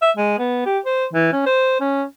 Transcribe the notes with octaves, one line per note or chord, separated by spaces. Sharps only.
E5
G#3
B3
G4
C5
E3
C#4
C5
C#4